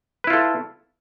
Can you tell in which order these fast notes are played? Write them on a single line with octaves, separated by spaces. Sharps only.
B4 E4 F4 A4